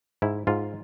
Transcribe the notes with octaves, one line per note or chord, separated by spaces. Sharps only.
G#2 E4
G#2 F4